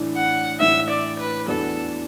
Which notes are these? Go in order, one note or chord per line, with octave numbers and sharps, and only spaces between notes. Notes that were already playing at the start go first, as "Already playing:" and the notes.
Already playing: A2 E3 A3 D4
F#5
A2 E3 A3 D4 E5
D5
B4
E2 E3 B3 D4 F#4 A4